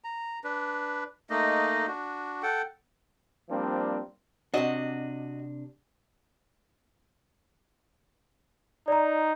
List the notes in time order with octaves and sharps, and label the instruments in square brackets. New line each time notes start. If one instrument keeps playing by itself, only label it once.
[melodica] A#5
D4 B4
A3 A#3 D#4 D#5
D4 F#4
A4 F#5 G5
[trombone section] F3 G3 A#3 C4 D4
[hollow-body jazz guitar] C3 D4 [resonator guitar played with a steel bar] F#4 D#5
[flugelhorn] D#4 [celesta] D5 A#5